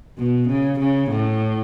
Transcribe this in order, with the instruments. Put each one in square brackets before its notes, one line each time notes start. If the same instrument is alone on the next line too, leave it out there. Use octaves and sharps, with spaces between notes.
[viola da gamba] B2
C#3
C#3
A2